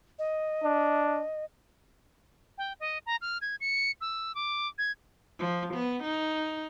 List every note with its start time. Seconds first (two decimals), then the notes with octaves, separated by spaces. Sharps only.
0.19 D#5
0.63 D4
2.58 G5
2.80 D#5
3.06 A#5
3.21 F6
3.41 G#6
3.61 C#7
4.01 E6
4.35 D6
4.78 G#6
5.39 F3
5.74 B3
6.03 D#4